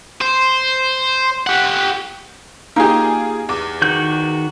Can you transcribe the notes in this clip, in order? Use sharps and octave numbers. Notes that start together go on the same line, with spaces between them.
C5
G4 F#5
A#3 D#4 F4 G4 G#4
E2 D6
D#3 F#4 G6